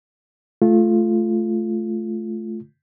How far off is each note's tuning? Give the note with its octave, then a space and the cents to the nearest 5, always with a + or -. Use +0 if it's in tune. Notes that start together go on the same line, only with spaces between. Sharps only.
A3 -20 F4 -10